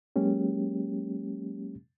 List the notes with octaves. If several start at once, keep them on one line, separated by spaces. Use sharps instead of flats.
F#3 G#3 A#3 C#4 G4